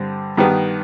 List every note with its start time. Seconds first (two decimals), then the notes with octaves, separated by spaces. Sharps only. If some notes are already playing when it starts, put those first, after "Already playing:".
Already playing: G2 D3 C4
0.37 G2 D#3 G3 B3